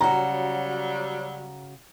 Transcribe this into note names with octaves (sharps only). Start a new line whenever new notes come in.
C#3 F#3 G3 F#4 A#5